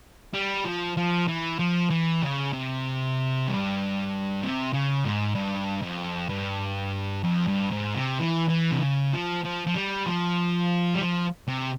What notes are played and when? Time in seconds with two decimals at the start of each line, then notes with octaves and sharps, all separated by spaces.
0.34 G3
0.65 F3
0.97 F3
1.28 E3
1.59 F3
1.90 E3
2.22 C#3
2.53 C3
3.48 G2
4.42 C3
4.73 C#3
5.05 G#2
5.35 G2
5.82 F2
6.29 G2
7.24 F2
7.47 G2
7.71 G#2
7.95 C3
8.19 E3
8.49 E3
8.72 C3
8.81 C#3
9.13 F3
9.44 F3
9.67 F3
9.75 G3
10.06 F3
10.95 G3
11.01 F3
11.48 C3